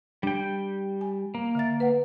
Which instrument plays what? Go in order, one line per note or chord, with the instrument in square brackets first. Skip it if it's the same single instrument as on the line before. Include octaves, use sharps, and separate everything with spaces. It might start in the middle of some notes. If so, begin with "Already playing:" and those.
[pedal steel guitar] G3 G5 [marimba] D4
[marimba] G#5
[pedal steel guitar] A#3
[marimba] D3 E5 A6
B4 F#5